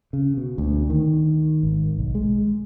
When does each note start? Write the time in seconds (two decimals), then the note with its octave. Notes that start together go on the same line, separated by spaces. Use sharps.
0.13 C#3
0.37 B2
0.58 D2
0.90 D#3
1.63 G#1
1.99 B1
2.15 G#3